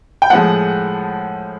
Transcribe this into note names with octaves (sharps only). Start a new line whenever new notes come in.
G5
A2 F3 G#3 F#5